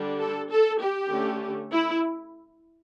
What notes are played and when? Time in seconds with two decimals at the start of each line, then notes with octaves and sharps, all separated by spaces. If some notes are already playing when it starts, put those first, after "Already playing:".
Already playing: D3 G3 D4
0.19 A4
0.50 A4
0.80 G4
1.09 D3 A3 C#4
1.71 E4